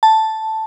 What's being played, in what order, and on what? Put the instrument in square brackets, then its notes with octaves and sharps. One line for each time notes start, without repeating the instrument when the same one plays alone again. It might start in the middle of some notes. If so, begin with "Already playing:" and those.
[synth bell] A5